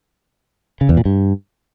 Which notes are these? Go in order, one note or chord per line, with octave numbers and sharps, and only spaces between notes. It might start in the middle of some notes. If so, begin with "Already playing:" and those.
C#3
E2
A#2
G2